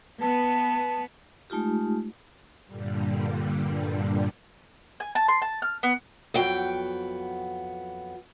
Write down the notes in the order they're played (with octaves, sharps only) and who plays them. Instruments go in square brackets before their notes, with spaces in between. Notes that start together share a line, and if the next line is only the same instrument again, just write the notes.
[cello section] B3 [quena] A5
[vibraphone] G#3 A3 D#4 F4 G4
[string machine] G2 A#2 D3 G3
[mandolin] G#5
A5
C6
A5
F6
B3
[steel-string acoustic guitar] F2 F#3 B3 G5